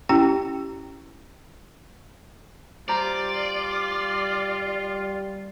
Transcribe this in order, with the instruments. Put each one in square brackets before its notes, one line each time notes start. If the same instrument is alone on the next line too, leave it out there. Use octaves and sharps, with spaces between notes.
[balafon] C#4 E4 G4 G5
[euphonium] G3 [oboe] F4 [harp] C5 A#5 [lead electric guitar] D5